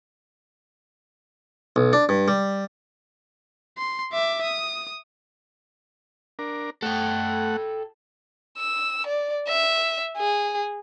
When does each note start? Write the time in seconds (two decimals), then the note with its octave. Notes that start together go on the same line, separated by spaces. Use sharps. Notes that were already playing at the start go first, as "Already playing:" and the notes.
1.76 B1
1.93 D4
2.09 G2
2.28 G3
3.78 C6
4.13 E5 D6
4.43 D#6
6.39 D4 A#4
6.83 A3 A4 F#5 G5
8.58 E6
9.07 D5
9.48 E5
10.17 G#4